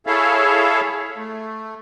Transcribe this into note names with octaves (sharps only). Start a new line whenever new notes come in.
E4 G#4 A4 C#5 E5 F5
A3